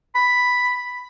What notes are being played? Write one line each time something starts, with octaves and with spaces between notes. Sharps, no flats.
B5